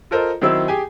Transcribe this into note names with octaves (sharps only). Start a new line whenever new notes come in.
F4 A4 A#4 C5 D#5
D#3 F#3 C4 E4 E6
G4 G#4 G5 G#5